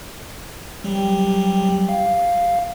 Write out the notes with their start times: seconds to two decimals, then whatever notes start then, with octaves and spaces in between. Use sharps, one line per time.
0.84 F#3 G3 G4
1.89 F5